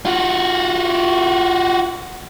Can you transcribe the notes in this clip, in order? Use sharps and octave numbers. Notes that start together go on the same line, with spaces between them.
F4 F#4